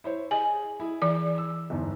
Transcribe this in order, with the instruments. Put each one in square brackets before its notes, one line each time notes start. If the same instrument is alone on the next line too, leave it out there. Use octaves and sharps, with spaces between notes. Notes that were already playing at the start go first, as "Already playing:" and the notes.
[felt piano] E4 C5 C#5
[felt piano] G#4 D#5 [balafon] G#5
[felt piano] E4 G#4
[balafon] E3 D5
[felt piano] E6
G1 E2 G#2